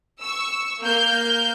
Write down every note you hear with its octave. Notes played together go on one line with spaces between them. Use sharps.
C#6 E6
A#3 F6 G6